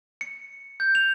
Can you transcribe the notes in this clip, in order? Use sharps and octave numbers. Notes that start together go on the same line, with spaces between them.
C#7
G6
F7